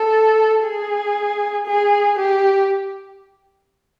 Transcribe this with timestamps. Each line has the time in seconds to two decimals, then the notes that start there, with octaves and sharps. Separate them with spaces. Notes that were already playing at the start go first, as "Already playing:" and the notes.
Already playing: A4
0.64 G#4
1.66 G#4
2.19 G4